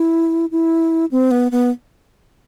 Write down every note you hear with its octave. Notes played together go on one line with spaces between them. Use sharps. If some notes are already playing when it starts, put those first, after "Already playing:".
Already playing: E4
E4
C4
B3
B3